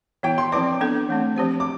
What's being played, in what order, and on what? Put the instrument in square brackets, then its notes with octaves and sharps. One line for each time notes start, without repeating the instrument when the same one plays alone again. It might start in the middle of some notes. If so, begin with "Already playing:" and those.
[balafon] E3 B3 E4 [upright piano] G5
[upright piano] C6
[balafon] F3 C4 E4 B4 D5 [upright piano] D6
[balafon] B3 D4 A4
E3 A3 C4
F3 C4 G4 C5
[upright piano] D6